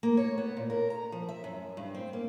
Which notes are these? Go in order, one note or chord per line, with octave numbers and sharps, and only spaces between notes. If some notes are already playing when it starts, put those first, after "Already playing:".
A#3
C#5
B3
A#2
A#4
A#5
F3
E5
F#2
G2
C4
A#3